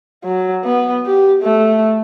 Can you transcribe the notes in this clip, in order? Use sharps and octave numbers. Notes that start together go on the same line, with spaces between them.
F#3
B3
G4
A3